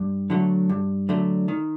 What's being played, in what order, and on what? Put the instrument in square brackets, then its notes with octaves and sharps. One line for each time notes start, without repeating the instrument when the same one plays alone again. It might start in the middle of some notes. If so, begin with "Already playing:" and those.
Already playing: [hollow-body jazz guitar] G2
D3 F#3 A3
G2
D3 F#3 A3
D#3